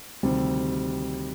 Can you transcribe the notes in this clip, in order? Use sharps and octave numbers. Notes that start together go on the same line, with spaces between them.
D2 C3 D#3 G3 C4